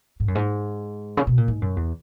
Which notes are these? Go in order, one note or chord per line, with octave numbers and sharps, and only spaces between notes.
G#2
F#2
G#2
C#3
B2
A#2
G#2
F#2
E2